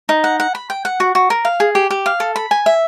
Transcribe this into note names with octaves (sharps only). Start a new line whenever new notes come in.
D#4
F#5
F#5
B5
G5
F#5
F#4
F#4
A#4
F5
G#4
G4
G4
F5
A4
B5
G#5
E5